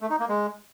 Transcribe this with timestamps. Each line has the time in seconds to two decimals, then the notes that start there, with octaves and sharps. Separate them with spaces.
0.01 A3
0.10 D#4
0.20 A#3
0.29 G#3